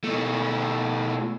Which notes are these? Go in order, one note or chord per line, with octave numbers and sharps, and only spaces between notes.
B2 A3